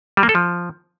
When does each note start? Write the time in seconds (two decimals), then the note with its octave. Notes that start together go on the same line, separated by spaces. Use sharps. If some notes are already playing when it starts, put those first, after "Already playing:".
0.17 G3
0.23 A#3
0.29 A4
0.35 F3